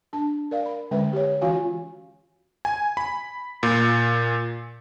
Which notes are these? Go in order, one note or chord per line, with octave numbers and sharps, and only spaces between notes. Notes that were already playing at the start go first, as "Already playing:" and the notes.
D4 A5
A#4 D5 F5
B5
D3 G#3 C#4 B4 E5
G4 C#5
E3 C#4 F4 F#4 F5 G#5
G#5
B5
A#2